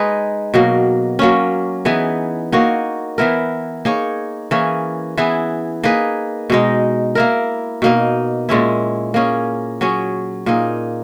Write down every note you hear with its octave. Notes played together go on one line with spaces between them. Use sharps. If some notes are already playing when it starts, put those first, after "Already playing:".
Already playing: G#3 D#4 G#4 B4
B2 F#3 A#3
F#3 A#3 C#4
E3 B3 D#4 G#4
A#3 D#4 F#4 C#5
E3 B3 E4 A#4
A#3 D#4 G#4 C#5
E3 A#3 C#4 G#4
E3 B3 E4 G#4
A#3 D#4 G#4 B4
B2 G#3 D#4
A#3 E4 A#4
B2 A#3 D#4
A#2 G#3 C#4 E4
A#3 C#4 G#4
F#3 C#4 G#4
A#2 A#3 D#4 G#4